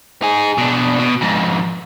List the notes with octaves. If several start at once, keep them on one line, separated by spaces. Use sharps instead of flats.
D#4 G#4
B2 D4
B2
F2 G#2